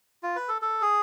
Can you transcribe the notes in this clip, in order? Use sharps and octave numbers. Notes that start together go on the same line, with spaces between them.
F4
B4
A4
A4
G#4